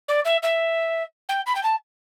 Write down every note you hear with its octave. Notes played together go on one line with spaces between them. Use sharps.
D5
E5
E5
G5
B5
G5
A5